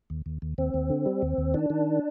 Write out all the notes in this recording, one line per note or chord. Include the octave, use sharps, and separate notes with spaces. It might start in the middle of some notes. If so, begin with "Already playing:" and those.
D#2
D#2
D#2
D#2 C4
D#2
D3
G3
D#2
D#2
D#3 D4
D#3